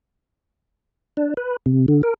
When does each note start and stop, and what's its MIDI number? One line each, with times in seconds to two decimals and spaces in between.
1.17 1.34 62
1.37 1.56 71
1.66 1.86 48
1.88 2.02 50
2.03 2.14 70